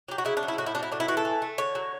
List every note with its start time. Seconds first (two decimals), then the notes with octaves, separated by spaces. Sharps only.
0.09 F#3 G4
0.18 F#4
0.25 C#3 E4
0.37 D4
0.43 F#3
0.48 E4
0.58 A2 F#4
0.66 E4
0.75 F#3 D4
0.83 E4
0.92 A2 D4
1.00 E4
1.08 E3 F#4
1.17 A4
1.25 E3
1.42 A3
1.58 D3 C#5
1.75 F#3